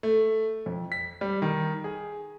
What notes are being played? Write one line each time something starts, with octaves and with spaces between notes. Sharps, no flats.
A3
F2
B6
G3
D#3
G#4